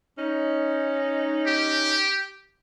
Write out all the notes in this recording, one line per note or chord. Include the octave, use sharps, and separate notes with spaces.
C#4 D#4
G4